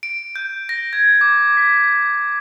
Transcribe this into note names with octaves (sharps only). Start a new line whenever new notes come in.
D7
G6
A#6
G#6
D6
B6